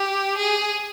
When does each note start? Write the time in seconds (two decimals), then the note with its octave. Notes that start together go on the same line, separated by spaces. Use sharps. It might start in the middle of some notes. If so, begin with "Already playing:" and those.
Already playing: G4
0.37 G#4